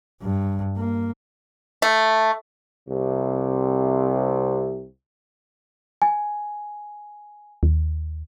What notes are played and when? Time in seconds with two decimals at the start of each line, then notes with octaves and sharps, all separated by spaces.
0.22 G2
0.76 A#3
1.82 A3
2.89 C2 C3
6.02 G#5
7.63 D#2